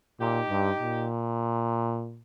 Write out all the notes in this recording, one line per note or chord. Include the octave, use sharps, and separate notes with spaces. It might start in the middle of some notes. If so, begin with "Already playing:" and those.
A#2 D#4 G4
G2
A#2